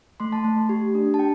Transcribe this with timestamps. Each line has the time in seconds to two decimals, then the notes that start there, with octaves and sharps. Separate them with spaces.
0.20 A3 C6
0.33 A5
0.44 A3
0.69 G4
0.95 D4
1.14 A5
1.19 G5